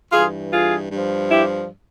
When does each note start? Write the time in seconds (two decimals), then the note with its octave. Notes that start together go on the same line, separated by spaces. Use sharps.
0.11 G2 E3 F4 G#4
0.52 F4 G#4
0.91 G2 F3
1.30 E4 G4